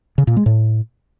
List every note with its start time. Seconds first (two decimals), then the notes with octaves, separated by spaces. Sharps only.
0.18 C#3
0.27 A#2
0.37 G#3
0.46 A2